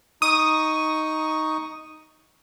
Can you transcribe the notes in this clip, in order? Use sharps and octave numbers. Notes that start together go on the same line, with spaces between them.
D#4 C#6 D#6